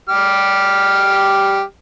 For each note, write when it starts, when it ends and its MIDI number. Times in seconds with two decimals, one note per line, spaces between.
0.09 1.62 55
0.09 1.62 67
0.09 1.62 89